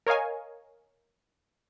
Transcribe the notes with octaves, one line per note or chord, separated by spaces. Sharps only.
A#4 C#5 D#5 F5 G#5